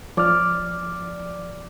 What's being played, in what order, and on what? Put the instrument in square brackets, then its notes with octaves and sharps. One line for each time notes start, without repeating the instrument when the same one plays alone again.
[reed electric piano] F3 D6 F6 [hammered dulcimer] D5